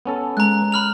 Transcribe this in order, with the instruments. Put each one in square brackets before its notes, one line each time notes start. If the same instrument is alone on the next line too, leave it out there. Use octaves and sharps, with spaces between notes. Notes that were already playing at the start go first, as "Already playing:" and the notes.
[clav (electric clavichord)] B3 C#4 A4
[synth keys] G#3 [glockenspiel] A#5 F#6
[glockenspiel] B5 F6 F7